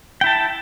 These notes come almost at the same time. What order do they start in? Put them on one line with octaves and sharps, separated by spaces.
G5 E4 A5